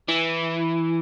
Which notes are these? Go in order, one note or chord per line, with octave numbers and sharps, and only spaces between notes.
E3